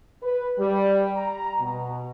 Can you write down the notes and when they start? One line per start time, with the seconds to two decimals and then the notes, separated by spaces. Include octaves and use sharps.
0.23 B4
0.59 G3
1.16 A#5
1.60 B2